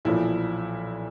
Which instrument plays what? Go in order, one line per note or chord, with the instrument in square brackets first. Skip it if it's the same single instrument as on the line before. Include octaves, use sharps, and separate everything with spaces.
[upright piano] B1 A#2 F3 [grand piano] E3 E4